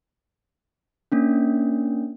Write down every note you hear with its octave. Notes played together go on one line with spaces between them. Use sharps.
A#3 C#4 D4